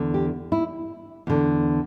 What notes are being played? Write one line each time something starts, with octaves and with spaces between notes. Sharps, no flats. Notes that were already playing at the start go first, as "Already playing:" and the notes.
Already playing: E2 D3
G4
E4
E2 D3